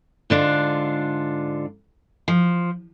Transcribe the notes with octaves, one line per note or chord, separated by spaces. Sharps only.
G#2 D3 D4 F4
F3